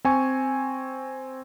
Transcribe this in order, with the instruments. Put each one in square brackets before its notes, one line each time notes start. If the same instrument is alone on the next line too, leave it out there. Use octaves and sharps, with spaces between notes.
[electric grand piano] C4 G#5 C#6